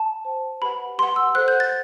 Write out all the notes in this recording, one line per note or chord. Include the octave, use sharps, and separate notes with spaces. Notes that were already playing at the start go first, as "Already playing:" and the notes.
Already playing: A5
C5 G5
G4 B4 F#5 B5
G4 B4 F#5 C6
E6
A4 C5 F#5 F#6
G6
A6